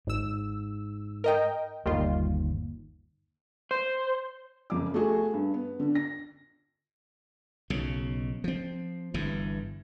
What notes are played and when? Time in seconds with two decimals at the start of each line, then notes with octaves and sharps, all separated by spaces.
0.07 G#1 G#2 E6
1.24 A#4 D#5 G5
1.86 G1 D#2 D#3 G3 F4
3.71 C5
4.70 F#1 F2 D6
4.94 A3 F#4 G#4
5.34 G2
5.54 B3
5.80 D3
5.95 A#6
7.70 B1 C#3
8.44 F3 C4
9.14 G1 G2 E3